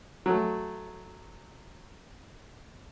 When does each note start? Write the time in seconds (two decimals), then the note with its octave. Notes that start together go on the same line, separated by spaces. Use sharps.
0.26 F#3 A3